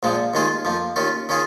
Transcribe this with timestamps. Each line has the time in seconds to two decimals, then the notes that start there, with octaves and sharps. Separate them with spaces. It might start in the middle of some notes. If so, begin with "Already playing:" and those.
0.03 A#1 A#2 F3 G#3
0.34 D#2 D#3 G#3 F4 G#4
0.65 F2 F3 A#3
0.96 D#2 D#3 C#4 F4
1.29 D#3 C#4 F4 G#4